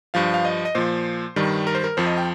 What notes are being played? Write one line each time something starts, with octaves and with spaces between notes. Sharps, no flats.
G2 F3 F5
F5
D#5
D#5
A#2 F3 C5
G2 D#3 G3
A#4
C5
A#4
F2 F3 C5
D#5
G5